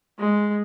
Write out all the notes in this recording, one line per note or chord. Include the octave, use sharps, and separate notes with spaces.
G#3